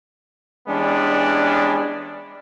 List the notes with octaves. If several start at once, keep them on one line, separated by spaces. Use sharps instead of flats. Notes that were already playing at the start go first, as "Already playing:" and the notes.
E3 G3 G#3 B3 C#4 D4